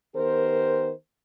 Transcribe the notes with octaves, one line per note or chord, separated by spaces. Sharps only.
D#3 B3 G4 A#4 C5